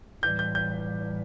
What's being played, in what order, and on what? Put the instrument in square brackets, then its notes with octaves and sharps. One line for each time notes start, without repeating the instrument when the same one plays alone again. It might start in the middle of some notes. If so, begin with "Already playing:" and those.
[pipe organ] A2 E3 G3 [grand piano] G6
[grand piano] G6
G6